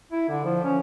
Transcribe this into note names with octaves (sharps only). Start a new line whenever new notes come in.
E4
D3
F3
C#4